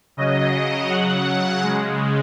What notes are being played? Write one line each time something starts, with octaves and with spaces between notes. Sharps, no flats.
C#3 F#3 D#5
C#3 F#3 F#5
C#3 G#3